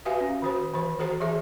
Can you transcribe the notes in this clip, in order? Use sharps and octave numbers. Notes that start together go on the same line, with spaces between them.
F#4 G4 B4 E5 F5 G#5
C#4
D#3 F#4 C5
D#3 E3 C5
F#4 A4 C5 A#5
E3 G#4 E5